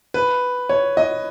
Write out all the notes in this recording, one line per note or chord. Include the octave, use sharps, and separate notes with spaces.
B4
C#5
D#5